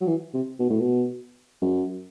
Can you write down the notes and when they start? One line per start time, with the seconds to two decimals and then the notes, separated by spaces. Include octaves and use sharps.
0.01 F#3
0.07 E3
0.34 C3
0.59 B2
0.70 A2
0.80 B2
1.62 F#2